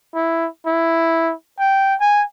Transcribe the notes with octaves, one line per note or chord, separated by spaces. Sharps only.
E4
E4
G5
G#5